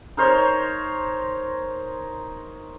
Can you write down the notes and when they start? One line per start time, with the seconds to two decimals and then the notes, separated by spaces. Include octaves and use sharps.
0.17 D#4 A#4 C5 C#5